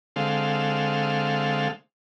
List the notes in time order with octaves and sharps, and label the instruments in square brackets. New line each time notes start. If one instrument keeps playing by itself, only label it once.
[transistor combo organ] D3 G#3 C4 A4 F5